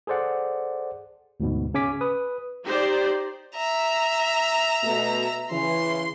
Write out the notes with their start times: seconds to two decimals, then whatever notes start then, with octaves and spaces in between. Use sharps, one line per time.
0.07 G#4 A4 C5 D5 F#5
1.40 D2 G#2 B2
1.74 C#3 C#4 G#5 D6 B6
2.01 B4 D#6
2.65 D#4 G4 C5 D5
3.55 E5 A#5
4.84 B2 A3
5.51 C#3 E3 C6